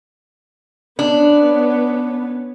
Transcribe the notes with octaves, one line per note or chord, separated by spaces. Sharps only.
B3 C#4 D4